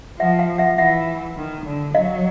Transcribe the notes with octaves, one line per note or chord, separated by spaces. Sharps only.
F3 E5 F#5
F5 G5
E5 F#5
E3 E5 F#5
D#3
D3
F#3 D#5 F5